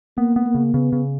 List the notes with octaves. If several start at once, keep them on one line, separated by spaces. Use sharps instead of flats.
A#3 B3
B3
A#3
C#3
C#3 B3
C#3